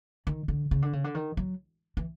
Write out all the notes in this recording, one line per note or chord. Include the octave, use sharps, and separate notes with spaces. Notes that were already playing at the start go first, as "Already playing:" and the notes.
D#3
D3
C#3
D3
C#3
D3
D#3
F#3
E3